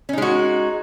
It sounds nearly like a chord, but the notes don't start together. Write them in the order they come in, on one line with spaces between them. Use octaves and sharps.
C#4 D#4 G#3 F#4